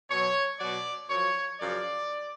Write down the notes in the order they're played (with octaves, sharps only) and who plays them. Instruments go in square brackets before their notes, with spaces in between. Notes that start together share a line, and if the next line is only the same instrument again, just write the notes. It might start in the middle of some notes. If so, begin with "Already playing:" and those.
[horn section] B2 F#3 C#5
B2 F#3 D5
F#2 F3 C#5
F#2 C#3 F3 D5